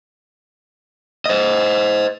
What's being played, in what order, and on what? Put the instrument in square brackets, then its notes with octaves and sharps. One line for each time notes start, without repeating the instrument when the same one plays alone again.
[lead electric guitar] C5 D#5